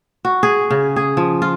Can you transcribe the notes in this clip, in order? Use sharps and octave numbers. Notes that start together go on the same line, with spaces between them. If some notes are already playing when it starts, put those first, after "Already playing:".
F#4
G#4
C#3
G#4
F3
F4